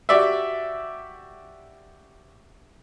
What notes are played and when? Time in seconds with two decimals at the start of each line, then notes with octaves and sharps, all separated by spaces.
0.09 F#4 G4 D5 E5